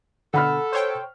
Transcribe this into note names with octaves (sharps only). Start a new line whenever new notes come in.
B2 D3 A4 F#5 B5 F6
C5 C#5 G5